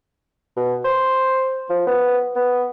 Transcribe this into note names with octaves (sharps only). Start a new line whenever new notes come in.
B2
C5
F3
B3
B3